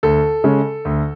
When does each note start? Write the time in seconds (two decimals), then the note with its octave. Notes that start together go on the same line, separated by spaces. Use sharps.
0.03 D2 A4
0.44 C#3 G#3 C#4
0.85 D2